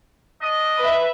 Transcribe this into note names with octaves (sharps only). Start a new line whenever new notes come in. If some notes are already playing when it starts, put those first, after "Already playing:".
D4 D#5
B4 E5